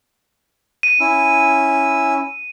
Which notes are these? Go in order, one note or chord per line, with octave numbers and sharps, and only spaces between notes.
D#7
C#4 E4 E6